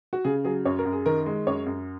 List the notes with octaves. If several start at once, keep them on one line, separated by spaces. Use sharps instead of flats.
F#4
C#3 G#4
F#3 G#4
F#2 C#5
A#4
F#2
G#4
D#3 A#4
G#3
F#2 C#5
F#2